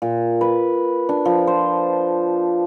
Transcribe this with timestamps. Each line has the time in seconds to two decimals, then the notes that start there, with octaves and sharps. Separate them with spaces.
0.02 A#2
0.41 B4
1.09 D4
1.25 F3
1.47 C5